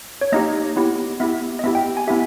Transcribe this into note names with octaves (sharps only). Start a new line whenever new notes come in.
C#5
A#3 D#4 G4 D#5
B3 E4 G4
B3 E4 G4 E5
D#5
B3 E4 G4 E5
G5
G#5
B3 E4 G4 E5